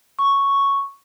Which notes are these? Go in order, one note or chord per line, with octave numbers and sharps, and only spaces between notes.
C#6